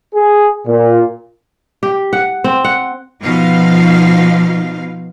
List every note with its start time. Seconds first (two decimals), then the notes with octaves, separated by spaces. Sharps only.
0.14 G#4
0.66 A#2
1.83 G4
2.13 F#5
2.44 C4
2.64 F#5
3.22 B2 F3 D#4 F5